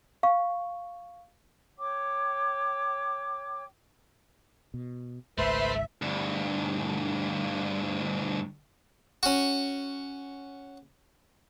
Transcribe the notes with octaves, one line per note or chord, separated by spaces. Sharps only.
F5 C#6
C#5 G5 D6
B2
G#1 C#2 G#2 A3 B4 C5 E5 C6
D2 G2
C#4 F#4